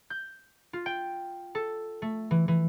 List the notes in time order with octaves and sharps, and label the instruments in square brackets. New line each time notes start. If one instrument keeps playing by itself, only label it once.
[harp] G6
F4
G5
A4
A3
E3
E3